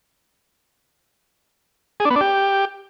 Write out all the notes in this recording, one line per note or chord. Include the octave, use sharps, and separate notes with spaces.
G#4
D4
B3
D4
G4